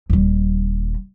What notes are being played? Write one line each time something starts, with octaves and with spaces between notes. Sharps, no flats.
D#1 G3